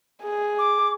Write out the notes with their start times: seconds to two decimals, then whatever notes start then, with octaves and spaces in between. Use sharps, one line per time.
0.23 G#4
0.58 D6